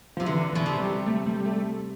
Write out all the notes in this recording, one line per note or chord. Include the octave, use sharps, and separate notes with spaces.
C3 F3
D3 E3
B2 E3
C3
G3
A3
G3
G3
A3